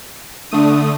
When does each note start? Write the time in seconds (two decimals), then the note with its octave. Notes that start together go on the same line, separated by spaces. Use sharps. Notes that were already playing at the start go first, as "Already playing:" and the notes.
0.51 D3 A3 D4 D#6